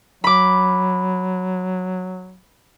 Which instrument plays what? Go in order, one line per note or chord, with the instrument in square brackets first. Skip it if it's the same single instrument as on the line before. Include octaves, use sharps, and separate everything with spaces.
[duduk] F#3 [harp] B5 D6